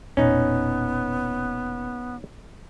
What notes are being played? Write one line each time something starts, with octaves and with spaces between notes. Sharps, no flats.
E1 A#2 B3 C#4 D#4